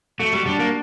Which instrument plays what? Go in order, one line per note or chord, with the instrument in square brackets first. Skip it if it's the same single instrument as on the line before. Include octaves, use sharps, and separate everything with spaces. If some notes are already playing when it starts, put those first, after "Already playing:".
[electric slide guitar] A3 [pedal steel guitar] F#4
[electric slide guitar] G3
[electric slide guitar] G3 [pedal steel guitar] D4
[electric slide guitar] A#3